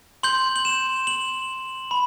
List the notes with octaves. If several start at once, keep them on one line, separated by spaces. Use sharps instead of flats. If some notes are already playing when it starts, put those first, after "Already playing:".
C6 G6 F#7
F#7
E7
F#7
B5